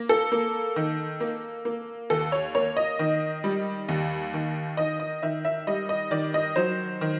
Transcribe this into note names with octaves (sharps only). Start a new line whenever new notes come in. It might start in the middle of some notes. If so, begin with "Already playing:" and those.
Already playing: A#3
A4
A#3
D#3
A#3
A#3
D#2 A4
C#5
A#3 C#5
D#5
D#3
G3
D#2
D#3
D#3 D#5
D#5
D#3 E5
E5
G3 D#5
D#5
D#3 D5
D#5
F#3 C5
D#3